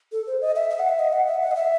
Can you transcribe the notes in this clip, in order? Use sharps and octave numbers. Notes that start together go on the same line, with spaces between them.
A4
C5
D#5
E5
E5
F#5
E5
D#5
F#5
E5
F#5
D#5
E5